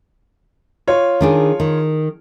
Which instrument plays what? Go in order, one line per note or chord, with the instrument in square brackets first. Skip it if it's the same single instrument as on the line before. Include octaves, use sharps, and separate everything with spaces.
[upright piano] F4 C#5
[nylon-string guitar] D#3 D4 G#4
D#3